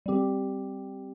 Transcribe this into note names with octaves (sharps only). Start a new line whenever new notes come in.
G3 C4 G4